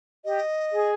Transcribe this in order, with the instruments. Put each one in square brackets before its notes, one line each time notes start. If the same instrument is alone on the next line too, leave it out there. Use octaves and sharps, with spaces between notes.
[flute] G4 [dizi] D#5
[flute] G#4